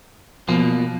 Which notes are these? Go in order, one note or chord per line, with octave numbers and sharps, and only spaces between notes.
B2 F3 A#3